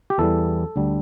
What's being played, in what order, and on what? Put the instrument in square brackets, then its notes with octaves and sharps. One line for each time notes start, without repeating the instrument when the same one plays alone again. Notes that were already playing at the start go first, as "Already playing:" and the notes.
[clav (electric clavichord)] G4
E2 E3 G3 A4
D2 D3 G3